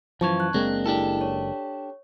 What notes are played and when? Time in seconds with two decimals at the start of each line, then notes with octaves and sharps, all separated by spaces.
0.21 F#2 E3 F3 A5 C#6 G#6
0.40 F#6
0.54 F#1 G#3 A#3 C4 D4 A#6
0.86 D4 E4 G4 A4
1.21 C#5